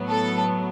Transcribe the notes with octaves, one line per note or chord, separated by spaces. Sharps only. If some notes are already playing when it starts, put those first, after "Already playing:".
Already playing: A2 F#3 B3
A4